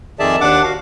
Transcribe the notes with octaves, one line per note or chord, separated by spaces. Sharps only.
F2 D#3 G#4 D5 E5 A5
D#2 D4 F#5 D6
F#4 F5